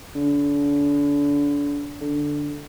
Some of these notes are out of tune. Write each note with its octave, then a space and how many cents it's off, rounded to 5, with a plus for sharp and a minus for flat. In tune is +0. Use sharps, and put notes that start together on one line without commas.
D3 -35
D3 +0